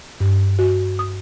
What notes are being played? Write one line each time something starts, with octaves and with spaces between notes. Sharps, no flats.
G2
F#4
D#6